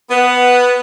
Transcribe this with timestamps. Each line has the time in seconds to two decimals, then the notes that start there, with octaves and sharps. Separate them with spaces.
0.10 B3